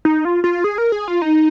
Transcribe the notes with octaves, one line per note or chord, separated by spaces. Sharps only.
D#4
F4
F4
G#4
A#4
G#4
F4
D#4